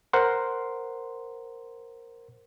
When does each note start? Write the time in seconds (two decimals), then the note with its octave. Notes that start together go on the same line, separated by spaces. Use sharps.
0.13 A#4 C5 F#5 C6